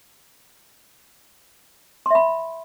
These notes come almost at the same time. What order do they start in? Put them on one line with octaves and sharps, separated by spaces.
C6 E5 B5